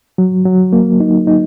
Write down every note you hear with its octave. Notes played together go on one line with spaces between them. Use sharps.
F#3
F#3
A#3
D#4
D#4